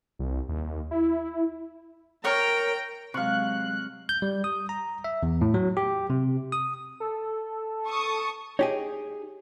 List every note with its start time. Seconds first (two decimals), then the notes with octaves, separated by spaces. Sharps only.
0.19 C2
0.49 D#2
0.91 E4
2.25 A#4 C#5 G5 A#5
3.14 C3 F#3 G#3 F5 C#6 F#6
4.09 G6
4.22 G3
4.44 D#6
4.69 A#5
5.04 E5
5.23 E2
5.41 A2
5.54 F#3
5.77 G4
6.10 C3
6.52 D#6
7.00 A4
7.88 A5 C#6 D#6
8.59 D#4 G4 G#4 C#5